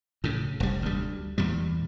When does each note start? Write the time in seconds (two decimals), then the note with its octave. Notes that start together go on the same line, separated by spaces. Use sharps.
0.24 A2 C#3
0.60 F1 G3
0.82 D2 G3
1.38 E2 A#2 G3